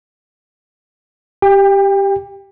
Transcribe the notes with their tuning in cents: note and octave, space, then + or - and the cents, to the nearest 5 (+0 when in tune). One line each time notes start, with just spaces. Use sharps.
G4 +0 G5 +35